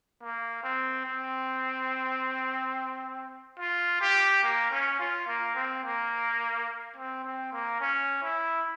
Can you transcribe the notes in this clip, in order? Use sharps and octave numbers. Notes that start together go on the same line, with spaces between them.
A#3
C4
C4
F4
G4
A#3
C#4
F4
A#3
C4
A#3
C4
C4
A#3
C#4
E4